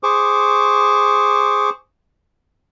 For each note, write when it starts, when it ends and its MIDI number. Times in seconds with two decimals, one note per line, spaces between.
0.03 1.70 68
0.03 1.70 72
0.03 1.70 85
0.03 1.70 86